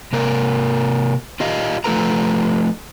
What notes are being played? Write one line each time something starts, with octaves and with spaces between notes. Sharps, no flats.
C3 A#3 A#4
F4 G4 D#5 F5
F3 A3 F4 A4 B4 A#5